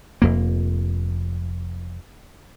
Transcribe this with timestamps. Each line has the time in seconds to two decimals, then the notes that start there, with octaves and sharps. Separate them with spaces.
0.22 F1 F2 A#3